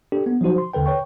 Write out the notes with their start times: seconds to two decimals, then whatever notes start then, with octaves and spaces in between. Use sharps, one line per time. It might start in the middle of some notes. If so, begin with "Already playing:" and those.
0.12 D4 G4 A4
0.26 B3
0.41 F3 F#3 D#4 F#4 C5
0.58 C6
0.73 D#2 D3 A4 B4 G5
0.86 B4 C#5 G5 C#6